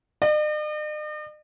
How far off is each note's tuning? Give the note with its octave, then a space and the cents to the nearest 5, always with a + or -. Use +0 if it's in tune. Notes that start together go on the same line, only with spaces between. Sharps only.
D#5 -45